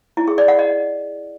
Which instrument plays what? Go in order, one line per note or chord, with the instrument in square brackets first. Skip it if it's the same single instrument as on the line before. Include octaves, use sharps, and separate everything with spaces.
[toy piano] E4
G#4
D5
F#5
D#5